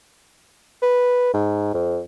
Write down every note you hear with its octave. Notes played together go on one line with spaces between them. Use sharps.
B4
G#2
F2